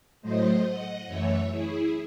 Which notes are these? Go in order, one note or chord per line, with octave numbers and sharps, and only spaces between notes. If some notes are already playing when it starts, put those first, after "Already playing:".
A2 F#3 A3 C5 D#5
D#5 F#5
F#2 E3 A3 C#5 E5
E4 G#4